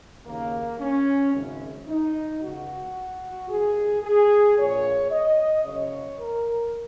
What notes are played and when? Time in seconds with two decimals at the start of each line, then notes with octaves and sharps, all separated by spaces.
0.26 D#2 C#3 A#3
0.80 C#4
1.34 G#1 F#2 C#3
1.88 D#4
2.41 C#2 C#3 F#4
3.49 D#2 D#3 G#4
4.03 G#4
4.57 A#1 A#2 C#5
5.11 D#5
5.64 F#1 F#2 C#3 C#5
6.19 A#4